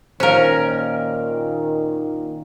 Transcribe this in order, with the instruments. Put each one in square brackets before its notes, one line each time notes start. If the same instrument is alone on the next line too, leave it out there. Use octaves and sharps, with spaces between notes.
[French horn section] A#2 D#3 [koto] C#4 A#4 [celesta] C5 F5